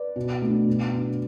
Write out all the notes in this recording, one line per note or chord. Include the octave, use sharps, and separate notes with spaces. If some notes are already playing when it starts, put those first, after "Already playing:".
Already playing: B4 D5
B2
A3 D4
B2
B3 D4